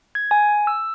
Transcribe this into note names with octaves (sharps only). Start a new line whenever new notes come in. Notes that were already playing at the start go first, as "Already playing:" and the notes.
G#6
G#5
E6